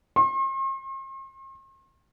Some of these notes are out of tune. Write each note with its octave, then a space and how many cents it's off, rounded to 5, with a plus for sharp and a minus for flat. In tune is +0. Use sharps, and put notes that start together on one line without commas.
C6 +45